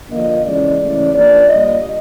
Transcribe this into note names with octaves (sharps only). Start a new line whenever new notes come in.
D3 F3 A#3 D4 D#5
C#3 E3 G#3 C#4 D5
C#3 E3 A3 C#4
F3 A#3 D4 D5
A#2 G3 A#3 D#5